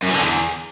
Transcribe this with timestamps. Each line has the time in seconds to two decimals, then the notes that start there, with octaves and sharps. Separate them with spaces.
0.03 F#2
0.09 E3
0.15 D3
0.21 E2